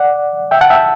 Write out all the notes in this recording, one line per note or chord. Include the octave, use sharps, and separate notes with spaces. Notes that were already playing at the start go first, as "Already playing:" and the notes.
Already playing: D5 F#5
E5 G5
F#5 A5
E5 G5